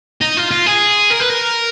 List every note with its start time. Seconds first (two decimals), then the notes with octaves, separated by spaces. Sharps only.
0.21 D#4
0.37 F4
0.51 F4
0.66 G#4
1.11 A#4
1.20 B4
1.31 A#4